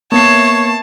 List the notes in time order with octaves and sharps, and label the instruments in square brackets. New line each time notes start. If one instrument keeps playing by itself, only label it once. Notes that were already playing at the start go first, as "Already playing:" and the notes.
[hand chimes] A#3 B3 C7 [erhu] C#5 [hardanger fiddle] A5